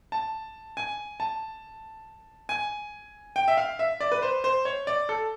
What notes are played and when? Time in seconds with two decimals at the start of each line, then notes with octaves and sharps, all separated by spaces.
0.12 A5
0.77 G#5
1.20 A5
2.49 G#5
3.36 G5
3.48 E5
3.57 F5
3.79 E5
4.01 D5
4.12 B4
4.22 C5
4.44 C5
4.65 C#5
4.87 D5
5.09 A4